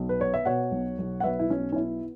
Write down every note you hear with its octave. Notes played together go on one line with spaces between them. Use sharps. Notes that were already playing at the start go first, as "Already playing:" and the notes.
Already playing: B1
B4
B3 C#5
E5
B2 C#5 F#5
B1
B1
F#5
B1 B4 E5
E4
B1 C#4
C#4
B3 E4